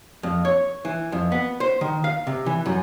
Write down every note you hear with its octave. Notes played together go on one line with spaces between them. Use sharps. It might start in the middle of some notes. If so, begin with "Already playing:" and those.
F2
C#5
E3
F2
B3
C5
D#3
F5
C3
E3
F#2